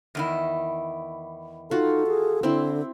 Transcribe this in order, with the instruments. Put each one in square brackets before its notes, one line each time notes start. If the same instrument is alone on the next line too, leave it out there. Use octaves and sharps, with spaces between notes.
[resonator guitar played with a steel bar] E2 D#3 E4
[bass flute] D#4 [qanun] F4 F#4 [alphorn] A4
[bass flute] G#4
[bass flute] D3 [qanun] C4 E4